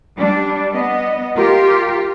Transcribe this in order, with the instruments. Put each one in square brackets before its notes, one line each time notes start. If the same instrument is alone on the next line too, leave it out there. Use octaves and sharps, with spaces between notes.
[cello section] G3 D4
B3 D#5
F4 G4 A#4